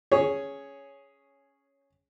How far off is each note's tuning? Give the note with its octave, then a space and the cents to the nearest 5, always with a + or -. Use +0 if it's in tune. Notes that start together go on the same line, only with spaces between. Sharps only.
C#4 +0 G#4 +0 C#5 +0